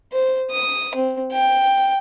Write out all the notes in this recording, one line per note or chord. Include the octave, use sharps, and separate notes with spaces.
C5
D#6
C4
G5